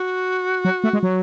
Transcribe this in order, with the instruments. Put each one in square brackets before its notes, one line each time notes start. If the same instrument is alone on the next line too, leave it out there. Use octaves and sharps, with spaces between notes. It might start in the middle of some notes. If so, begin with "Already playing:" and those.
Already playing: [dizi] F#4
[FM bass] F#3
A3
G#3
F#3